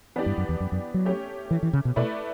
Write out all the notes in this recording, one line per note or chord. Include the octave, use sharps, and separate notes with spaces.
E3 B3 D4 G4 D5
G2
F#2
E2
F#2
F#2
F#3
A3 C#4 G4 C#5
E3
E3
C#3
B2
B2 A3 E4 B4 D5